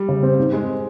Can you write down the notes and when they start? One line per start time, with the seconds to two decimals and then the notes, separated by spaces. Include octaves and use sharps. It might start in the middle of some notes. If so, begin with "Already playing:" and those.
Already playing: G3
0.09 C#3
0.23 C4
0.38 G#2
0.52 G#3 C4